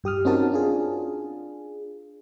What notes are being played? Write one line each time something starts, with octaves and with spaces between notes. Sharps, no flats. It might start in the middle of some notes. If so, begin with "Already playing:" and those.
G2 G4 D#6 F6
C4 C#4 D#4 F#4 A#4 A5
D4 F4 G#4